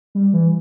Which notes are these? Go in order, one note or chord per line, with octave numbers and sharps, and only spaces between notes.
G3
E3